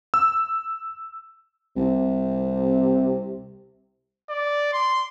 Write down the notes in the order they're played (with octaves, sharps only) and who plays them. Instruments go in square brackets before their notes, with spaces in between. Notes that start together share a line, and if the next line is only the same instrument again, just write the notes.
[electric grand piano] E6
[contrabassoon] C2 [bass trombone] C3
[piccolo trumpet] D5
C6